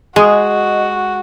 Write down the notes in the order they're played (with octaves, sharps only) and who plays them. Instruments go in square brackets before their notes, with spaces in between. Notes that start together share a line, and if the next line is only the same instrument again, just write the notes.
[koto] G#3 [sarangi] F#4 [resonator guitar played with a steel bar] G#4 [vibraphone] D#5